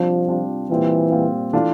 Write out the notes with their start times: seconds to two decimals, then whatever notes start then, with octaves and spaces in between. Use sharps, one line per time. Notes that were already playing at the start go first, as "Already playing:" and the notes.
Already playing: C3 F3 G3 D4 F4
0.28 C3 G3 D4 F4
0.70 A#2 E3 G3 C4 F4
1.11 A#2 G3 C4 F4
1.53 E3 A3 D4 F4